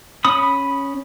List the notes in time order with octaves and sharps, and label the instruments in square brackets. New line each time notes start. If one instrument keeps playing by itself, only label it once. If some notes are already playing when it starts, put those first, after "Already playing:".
[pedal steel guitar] C#4 B5 D#6